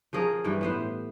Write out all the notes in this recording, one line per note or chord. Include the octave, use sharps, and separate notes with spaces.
F3 C#4 G#4 A#4
G2 E3 G5
A2 B3 C5